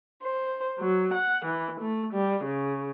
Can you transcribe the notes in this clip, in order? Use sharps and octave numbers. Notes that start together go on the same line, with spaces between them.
C5
F#3
F#5
E3
A3
G3
C#3